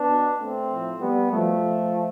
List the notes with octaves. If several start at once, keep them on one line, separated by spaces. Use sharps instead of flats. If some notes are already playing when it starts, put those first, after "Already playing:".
Already playing: B3 D4
B2
A3 C4
A2 F3
G3 B3
B2 F3 A3